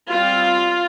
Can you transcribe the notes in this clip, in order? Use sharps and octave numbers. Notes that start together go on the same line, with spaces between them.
G3 C4 F4